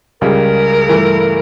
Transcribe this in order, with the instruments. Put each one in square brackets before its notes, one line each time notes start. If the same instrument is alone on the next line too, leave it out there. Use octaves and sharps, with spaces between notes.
[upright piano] C#2 C#3 G3 [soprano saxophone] A#4
[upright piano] G2 E3 A3